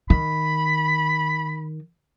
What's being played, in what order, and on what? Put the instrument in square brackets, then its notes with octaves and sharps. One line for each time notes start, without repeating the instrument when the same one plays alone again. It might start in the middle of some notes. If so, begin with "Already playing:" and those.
[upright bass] D#3 [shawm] B5